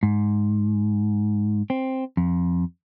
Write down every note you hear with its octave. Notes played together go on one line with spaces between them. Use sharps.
G#2
C4
F2